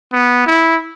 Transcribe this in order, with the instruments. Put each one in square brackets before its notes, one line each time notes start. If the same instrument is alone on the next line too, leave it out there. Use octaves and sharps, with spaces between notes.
[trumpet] B3
E4